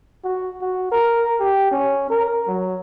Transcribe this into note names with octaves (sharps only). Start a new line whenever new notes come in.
F#4
F#4
A#4
G4
C#4
A#4
F#3